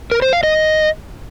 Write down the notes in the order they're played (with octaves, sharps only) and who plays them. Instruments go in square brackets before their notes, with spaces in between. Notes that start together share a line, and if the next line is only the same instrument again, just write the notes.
[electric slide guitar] A#4
C5
F5
D#5